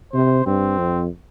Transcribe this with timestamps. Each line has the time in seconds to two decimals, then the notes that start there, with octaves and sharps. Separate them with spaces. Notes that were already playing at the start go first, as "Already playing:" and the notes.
0.13 C3 C5
0.46 G2 C4
0.78 F2